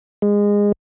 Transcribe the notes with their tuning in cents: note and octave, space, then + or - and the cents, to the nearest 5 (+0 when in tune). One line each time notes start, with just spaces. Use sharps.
G#3 -20